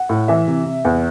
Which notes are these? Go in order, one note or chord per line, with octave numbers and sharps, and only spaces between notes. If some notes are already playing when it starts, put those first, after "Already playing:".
Already playing: F#5
A2
E3 E5
C3
C3
E2